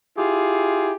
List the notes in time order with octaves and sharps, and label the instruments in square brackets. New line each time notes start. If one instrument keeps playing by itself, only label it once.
[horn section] E4 F4 G4 G#4